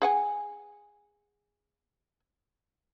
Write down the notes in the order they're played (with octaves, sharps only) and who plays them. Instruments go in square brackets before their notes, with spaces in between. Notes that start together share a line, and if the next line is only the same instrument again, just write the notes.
[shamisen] G#4 F#5 G#5